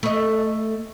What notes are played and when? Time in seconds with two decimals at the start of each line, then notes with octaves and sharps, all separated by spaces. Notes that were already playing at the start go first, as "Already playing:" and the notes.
0.03 A3 D#5